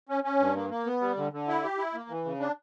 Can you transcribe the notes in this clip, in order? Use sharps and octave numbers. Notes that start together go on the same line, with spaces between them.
C#4
C#4
G2
A#3
A#3
B3
G3
D3
D3
E4
G4
E4
A#3
E3
C#3
D4